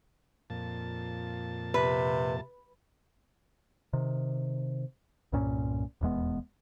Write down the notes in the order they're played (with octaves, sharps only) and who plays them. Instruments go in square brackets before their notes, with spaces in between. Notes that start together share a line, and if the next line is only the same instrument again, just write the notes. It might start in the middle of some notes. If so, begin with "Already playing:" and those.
[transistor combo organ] F2 A#2 A5
[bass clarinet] C3 [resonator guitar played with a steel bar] B4
[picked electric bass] C3 D#3
C2 G2 A#2 C#4
D#1 E2 G#3 B3